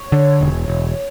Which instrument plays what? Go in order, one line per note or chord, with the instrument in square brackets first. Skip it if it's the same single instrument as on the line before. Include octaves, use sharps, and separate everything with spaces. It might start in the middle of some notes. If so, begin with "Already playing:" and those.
Already playing: [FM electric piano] C#5
[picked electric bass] D3
E1
E1